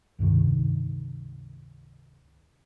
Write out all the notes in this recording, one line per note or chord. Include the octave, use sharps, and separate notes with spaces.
C#2 G2 C3 D#3